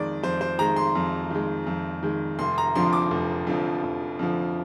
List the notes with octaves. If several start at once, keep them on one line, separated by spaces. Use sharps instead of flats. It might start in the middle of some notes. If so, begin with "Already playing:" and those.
Already playing: F2 D#3 G#3 D5
F2 C5
C5
D#3 G#3 A#5
C6
F2
D#3 G#3
F2
D#3 G#3
F1 C6
A#5
F2 D3 F3 C6
D6
F1
F2 D3 F3
F1
F2 D3 F3